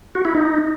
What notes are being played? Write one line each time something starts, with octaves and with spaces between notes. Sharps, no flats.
F#4
E4
D#4